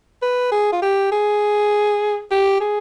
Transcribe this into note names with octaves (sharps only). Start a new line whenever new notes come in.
B4
G#4
F4
G4
G#4
G4
G#4